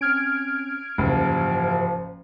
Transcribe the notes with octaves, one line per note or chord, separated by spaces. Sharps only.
C4 C#4 F6 G#6 D7
F#1 G#2 E3 F3 G4